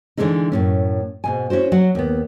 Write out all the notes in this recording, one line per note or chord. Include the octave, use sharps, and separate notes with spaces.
D3 E3 F#3 G#3 A3 D#4
F#2 A2 C#4
G#2 B2 G#5
C#4 E4 F#4 C5
F#3 F#4 F#5
D#2 B3